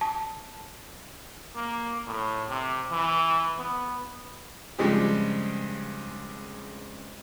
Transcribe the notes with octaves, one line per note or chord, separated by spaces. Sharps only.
A5
A#3
A2
C3
E3
B3
G2 C#3 F3 G#3 C4 G4